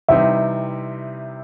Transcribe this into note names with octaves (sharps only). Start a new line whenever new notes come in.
C3 E3 G3 C4 D#4 E5